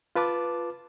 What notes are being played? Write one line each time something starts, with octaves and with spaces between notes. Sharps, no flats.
F4 B4 A5 D6